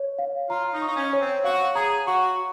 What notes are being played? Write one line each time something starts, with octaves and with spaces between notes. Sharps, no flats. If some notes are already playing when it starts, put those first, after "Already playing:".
Already playing: C#5
F5
F4 A#5
D#4
C#6
D#4
C#4
C#5
C4
F#4 F5
G#4 A#5
F#4 C#6